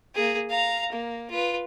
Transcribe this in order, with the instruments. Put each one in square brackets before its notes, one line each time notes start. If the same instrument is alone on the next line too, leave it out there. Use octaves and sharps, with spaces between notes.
[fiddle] A#3 G#4
F5 A#5
A#3
F4 B4